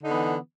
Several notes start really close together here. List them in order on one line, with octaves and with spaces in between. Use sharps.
D3 D#4 B3 E3